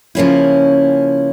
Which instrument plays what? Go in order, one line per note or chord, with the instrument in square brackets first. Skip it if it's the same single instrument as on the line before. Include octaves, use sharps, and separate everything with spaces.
[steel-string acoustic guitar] C#3 F3 A#3 C#4 E4